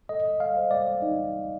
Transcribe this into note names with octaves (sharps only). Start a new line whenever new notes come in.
A4 D#5
F5
C5 D#5
D5
D#4